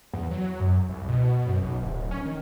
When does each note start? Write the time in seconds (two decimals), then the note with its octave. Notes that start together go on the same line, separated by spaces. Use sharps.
0.13 E2
0.31 F#3
0.60 F#2
0.89 C2
1.08 B2
1.47 F#2
1.63 B1
1.82 D1
2.11 C#4
2.25 D#3